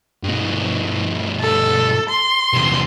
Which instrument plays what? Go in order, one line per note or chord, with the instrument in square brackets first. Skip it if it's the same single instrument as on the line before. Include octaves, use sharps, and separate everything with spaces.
[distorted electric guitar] G2 B2
[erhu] A4
C6
[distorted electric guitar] E2 C3